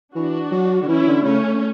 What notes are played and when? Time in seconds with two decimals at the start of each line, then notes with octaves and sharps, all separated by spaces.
0.15 E3 D4 F#4
0.51 F#3
0.82 D3
0.88 E3 C#4 E4
1.07 D3
1.25 C#3 A3 C#4